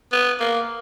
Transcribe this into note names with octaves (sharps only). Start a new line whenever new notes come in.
B3
A#3